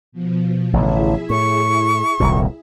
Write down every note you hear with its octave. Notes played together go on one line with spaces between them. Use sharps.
B2 F3
A1 D3 E4 G#4 E5
A2 C#6
D#1 C2 A#2